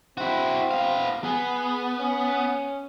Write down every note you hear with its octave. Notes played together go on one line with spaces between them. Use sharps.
C4 E4 F#4
B3 F5
B3 G#4
C#4